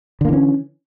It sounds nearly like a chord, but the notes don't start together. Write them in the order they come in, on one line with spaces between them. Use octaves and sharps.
D3 A#3 E3 C#4